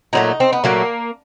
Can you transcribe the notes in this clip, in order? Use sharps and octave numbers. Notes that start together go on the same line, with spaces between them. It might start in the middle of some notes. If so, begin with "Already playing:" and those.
A#2 F#3 A3 D#4
C4
B3
A#2 F#3 A3 A#3